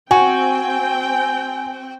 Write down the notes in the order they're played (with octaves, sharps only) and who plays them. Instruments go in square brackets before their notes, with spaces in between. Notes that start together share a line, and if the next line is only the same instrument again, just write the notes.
[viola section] C4 G5 [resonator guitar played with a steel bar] F#4 [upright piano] G#5